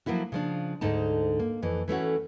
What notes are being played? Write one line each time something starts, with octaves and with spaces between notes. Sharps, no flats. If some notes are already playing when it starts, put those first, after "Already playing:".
F3 F#3 A#3 E4 F#4
C#3 F3 D4
D2 G#2 D3 D#4 A5
A#3
F2 E3
E3 A3 C#4 F#4